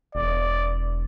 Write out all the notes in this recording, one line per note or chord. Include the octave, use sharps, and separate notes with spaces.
E1 D5